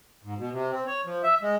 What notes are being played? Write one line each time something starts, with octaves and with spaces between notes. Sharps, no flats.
G#2
B2
C3
C4
C#5
F3
E5
G#3